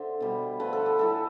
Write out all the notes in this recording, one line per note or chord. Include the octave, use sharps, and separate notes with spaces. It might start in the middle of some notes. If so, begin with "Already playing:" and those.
Already playing: D3 C5 E5
B2 G3
D3 F3 A3 B4
A4
G4
A2 E3 G3 A4